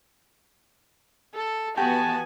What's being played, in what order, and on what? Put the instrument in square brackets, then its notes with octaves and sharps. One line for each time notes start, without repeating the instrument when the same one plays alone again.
[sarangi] A4
[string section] E3 B3 F#4 [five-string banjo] G4 [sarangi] G#5 [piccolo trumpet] A5